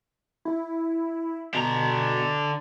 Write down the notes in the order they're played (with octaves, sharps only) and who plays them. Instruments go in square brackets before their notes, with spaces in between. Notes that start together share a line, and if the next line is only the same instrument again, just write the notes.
[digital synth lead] E4
[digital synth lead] B2 [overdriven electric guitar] D3 A#5